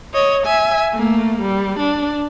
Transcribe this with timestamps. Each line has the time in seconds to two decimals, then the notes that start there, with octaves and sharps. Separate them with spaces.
0.14 C#5 D#5
0.46 E5 G#5
0.94 A3 A#3
1.42 G3
1.79 D4